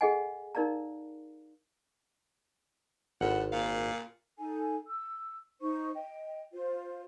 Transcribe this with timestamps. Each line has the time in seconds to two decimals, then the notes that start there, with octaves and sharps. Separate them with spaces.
0.01 G#4 A4 D#5 F#5 G#5
0.55 D#4 A#4 D5 F5 A#5
3.21 G#1 A2 F#5
3.52 A#2 F5
4.37 D#4 A4 G#5
4.87 E6
5.61 D#4 C5 C#6
5.94 D#5 G5
6.53 F4 C5